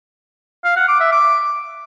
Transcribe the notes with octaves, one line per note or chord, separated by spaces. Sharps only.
F5
F#5
D6
E5
D6